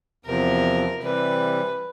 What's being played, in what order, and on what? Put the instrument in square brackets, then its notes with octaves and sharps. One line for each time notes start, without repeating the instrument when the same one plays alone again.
[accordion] E2 C3 F3 [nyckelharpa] A#4
[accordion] C3 E3 G3 [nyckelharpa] B4